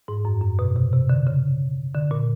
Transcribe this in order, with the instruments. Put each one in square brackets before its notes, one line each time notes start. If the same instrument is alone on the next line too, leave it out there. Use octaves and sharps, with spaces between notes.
[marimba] G#2
F#2
F#2
B2
C3
C3
D3
C#3
D3
A#2